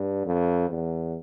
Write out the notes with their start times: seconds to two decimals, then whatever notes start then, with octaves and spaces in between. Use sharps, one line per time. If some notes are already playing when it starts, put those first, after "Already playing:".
Already playing: G2
0.25 F2
0.70 E2